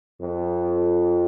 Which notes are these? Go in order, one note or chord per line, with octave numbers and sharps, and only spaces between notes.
F2